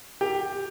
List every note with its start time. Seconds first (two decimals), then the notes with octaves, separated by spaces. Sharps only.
0.21 G4